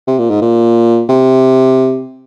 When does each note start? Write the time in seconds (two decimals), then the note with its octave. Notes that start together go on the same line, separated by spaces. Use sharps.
0.07 C3
0.19 A#2
0.30 G#2
0.41 A#2
1.09 C3